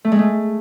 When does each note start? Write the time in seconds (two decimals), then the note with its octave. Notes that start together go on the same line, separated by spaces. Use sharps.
0.05 A3
0.12 G#3
0.19 A3